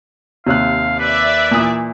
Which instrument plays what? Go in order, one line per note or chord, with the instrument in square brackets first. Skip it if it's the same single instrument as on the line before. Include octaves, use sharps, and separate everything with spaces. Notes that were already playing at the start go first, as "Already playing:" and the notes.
[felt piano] D#2 C#5 F#6 [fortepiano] C3 [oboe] F5
[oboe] B4 [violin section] D5 E5
[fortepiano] A#2 E3 D#6